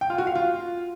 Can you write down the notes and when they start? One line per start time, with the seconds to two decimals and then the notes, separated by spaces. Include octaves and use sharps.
0.01 G5
0.10 F4
0.18 F#4
0.27 F5
0.35 F4